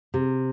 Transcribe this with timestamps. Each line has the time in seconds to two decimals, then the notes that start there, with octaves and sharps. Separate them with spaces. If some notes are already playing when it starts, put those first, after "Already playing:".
0.14 C3